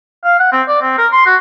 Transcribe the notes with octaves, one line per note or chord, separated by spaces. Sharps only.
F5
F#5
C4
D5
C4
A#4
C6
F#4